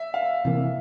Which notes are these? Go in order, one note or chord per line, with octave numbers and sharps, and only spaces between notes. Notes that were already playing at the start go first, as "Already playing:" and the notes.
Already playing: E5
F5
C3 E3 A#3